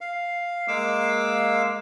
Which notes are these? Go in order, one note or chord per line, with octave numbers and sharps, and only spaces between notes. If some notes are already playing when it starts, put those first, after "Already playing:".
F5
G#3 A#3 F5 D6 E6